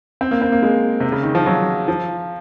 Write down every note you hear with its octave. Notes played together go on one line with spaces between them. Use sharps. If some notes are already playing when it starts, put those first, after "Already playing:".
C4
A#3
C4
A#3
G#3
C3
C#3
D#3
F3
F#3
F3